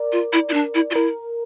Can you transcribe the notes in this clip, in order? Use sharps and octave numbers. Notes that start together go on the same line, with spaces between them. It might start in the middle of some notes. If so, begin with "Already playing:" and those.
Already playing: A#4 D5
F4
E4
E4
D4
E4
F4
E4 A#4